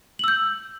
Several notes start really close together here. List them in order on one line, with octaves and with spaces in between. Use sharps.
F#7 E6 G6